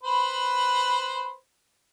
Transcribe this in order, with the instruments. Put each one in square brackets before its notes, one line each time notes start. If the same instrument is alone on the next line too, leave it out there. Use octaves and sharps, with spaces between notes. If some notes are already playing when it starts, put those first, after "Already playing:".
[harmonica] B4 C5 B5